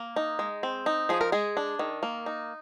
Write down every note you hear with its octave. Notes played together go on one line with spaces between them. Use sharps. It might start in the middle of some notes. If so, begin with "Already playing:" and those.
Already playing: A#3
D#4
G#3
C4
D#4
F3 G#4
A#4
G#3 G#4
D4
D#3
A#3
D#4